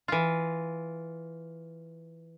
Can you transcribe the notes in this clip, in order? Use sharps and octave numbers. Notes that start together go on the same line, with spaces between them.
E3 F4